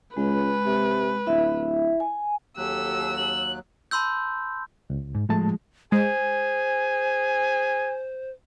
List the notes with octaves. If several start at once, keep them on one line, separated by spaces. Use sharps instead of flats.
C#2 G#3 B4
C3
D1 E4 E5
G#5
D#2 F#3 G4 A4 E6 F#6
F#7
A5 B5 C6 E6 G6
C#2
G#2
A2 F3 G#3 A3 A5
G#3 G#4 C5 G#5